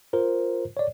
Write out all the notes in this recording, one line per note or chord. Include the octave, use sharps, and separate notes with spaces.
F4 A#4 C5
C#5 D5